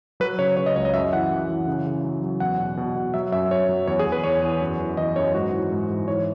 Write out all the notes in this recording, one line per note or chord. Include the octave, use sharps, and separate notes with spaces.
F#3 B4
C#3 C#5
C#3 C#5
D#5
C#2 C#5
D#5
F#2 E5
E3 F#5
F#2
E3
C#3
C#3
F#3
F#3
E2 F#5
B2
B2
B2
F#3 E5
F#2 E5
F#2 C#5
F#3
E2 C#5
G#4
E2
B4
E2 C#5
E2
F#2
E3
E3 D#5
F#2 C#5
G#2 F#4
E3
G#2
G#2
E3 C#5